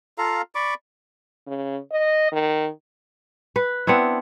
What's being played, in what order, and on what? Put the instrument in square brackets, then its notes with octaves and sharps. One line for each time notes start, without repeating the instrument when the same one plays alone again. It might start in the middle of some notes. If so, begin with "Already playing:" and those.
[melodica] F4 A4 F5 A#5
D5 B5 C#6 D6
[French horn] C#3
D#5
D#3
[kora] B4
B3 C4 D4 E4